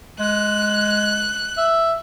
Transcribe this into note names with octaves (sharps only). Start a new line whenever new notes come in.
G#3 F#6
E5